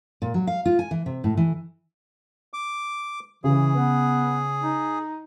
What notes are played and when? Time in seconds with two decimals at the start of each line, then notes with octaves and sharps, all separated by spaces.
0.22 A#2
0.34 F#3
0.47 F5
0.66 F4
0.79 G#5
0.91 E3
1.06 C3
1.24 A2
1.37 E3
2.53 D6
3.44 C#3 E3 G#4
3.76 B3
4.62 D#4